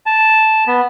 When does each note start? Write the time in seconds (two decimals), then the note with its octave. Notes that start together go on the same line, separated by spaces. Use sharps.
0.06 A5
0.67 B3